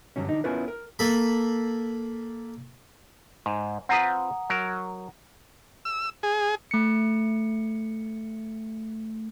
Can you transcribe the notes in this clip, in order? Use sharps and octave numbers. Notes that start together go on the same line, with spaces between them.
G2 A#2 D3 F#3 C#4
D3 D#4
B3 C#4 E4 F4 A#4 B4
A#4
A#3 A4 B5
G#2
C4 F4 B4 F#5 A#5 D#6
F#3 A#4
E6
G#4
A3 C#7